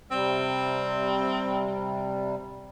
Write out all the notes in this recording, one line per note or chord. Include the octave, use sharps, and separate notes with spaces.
C3 G3 C4